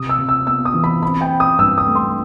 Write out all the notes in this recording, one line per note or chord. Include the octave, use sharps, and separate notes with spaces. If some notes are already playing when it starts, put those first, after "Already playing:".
Already playing: C3 D#6
E6
C3
E6
B3 E6
D#6
E3
B5
C4 B5
G5
C4
D#6
G2 E6
D#6
A3
C6